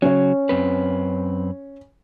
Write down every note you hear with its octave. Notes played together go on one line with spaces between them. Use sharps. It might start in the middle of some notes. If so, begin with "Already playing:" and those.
C#3 F#3 C#4 C#5
F#2 C4 B4